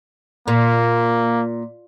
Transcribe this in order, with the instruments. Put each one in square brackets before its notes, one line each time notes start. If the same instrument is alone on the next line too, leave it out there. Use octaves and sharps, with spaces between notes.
[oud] A#2 [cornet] A#3